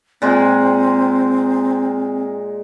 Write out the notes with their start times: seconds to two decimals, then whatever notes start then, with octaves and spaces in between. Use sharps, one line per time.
0.22 A#2 G#3 C4